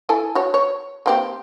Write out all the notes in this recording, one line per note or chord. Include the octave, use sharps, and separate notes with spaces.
E4 A4 G#5
F#4 C#5
C#5
A#3 C4 G4